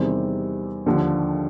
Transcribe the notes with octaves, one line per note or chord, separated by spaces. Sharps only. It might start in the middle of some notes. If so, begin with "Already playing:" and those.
Already playing: E2 C3 D#3 G3 C4
D#2 D3 F3